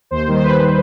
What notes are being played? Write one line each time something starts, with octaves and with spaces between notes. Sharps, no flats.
D#2 C5
D#3 G3
C5
D#2 B4
D#3 G3